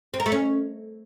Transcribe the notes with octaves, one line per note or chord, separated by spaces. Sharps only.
C4
A#4
A3
C#4